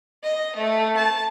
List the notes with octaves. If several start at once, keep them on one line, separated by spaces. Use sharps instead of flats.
D#5
A3
A5